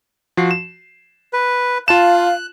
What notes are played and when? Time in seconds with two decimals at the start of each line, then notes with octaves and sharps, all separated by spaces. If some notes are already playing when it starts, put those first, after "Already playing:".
0.37 F3 F#4 C7
0.51 E7
1.33 B4
1.88 F4 F5 A5 F#6 E7